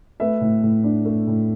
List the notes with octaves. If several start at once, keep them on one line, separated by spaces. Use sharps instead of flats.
A3 B4 E5
A2
A2
D4
A3
A2